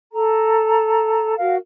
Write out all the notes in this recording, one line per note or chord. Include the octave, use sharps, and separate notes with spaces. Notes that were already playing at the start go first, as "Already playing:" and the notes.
A4 A#5
F#4 A#4 F5